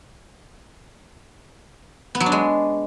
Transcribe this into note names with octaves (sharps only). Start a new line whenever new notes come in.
B3
F#3
D4
G#3